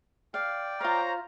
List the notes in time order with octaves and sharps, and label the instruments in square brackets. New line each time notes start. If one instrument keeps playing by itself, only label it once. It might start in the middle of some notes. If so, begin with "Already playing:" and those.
[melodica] D5 G5 [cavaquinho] F5
[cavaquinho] F4 F5 [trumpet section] C5 C#5 A#5